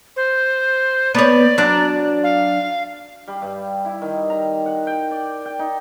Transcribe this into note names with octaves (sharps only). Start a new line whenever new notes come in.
C5
B3 C#5 D5
F#3 D4
F5
G3
G2
E4
D#3
A#5
F#5
G5
D5
G5
D#4